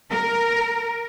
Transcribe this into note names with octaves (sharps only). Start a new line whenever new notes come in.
A#4